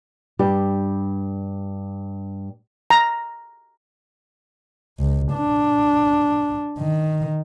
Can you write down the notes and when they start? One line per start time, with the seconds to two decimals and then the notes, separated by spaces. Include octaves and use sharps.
0.39 G2 G3 G4
2.90 A#5
4.99 C#2
5.33 D4
6.79 D#3